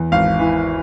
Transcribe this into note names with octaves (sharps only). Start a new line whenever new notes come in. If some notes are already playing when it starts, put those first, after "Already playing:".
Already playing: E2
G#1 F5
E3